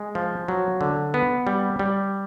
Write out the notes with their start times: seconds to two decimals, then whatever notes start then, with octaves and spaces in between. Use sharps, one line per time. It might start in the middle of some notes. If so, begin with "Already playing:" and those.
Already playing: G#3
0.15 F3
0.48 F#3
0.81 D3
1.14 B3
1.47 G3
1.79 G3